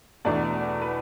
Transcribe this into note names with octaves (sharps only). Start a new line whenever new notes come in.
E2 B2 A3 D4 D5
B4